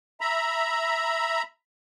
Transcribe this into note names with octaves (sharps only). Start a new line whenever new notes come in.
E5 A#5 B5